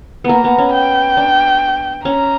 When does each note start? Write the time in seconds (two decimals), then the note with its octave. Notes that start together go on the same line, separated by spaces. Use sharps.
0.24 A#3 B3 A#5
0.44 B3
0.58 C#4
0.73 G5
1.17 D4
2.05 C#4 A#5